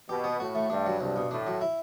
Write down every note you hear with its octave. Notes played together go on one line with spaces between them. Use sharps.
B2 G4
B3
A2 F#4
A3
G2 D4
F#3
C2 G2
B2
A2 D4
F#3
E4